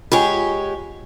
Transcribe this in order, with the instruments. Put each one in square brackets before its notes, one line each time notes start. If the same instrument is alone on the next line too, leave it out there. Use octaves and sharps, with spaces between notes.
[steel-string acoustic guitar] G#3 G4 C#5 [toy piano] F4 F#5 G#5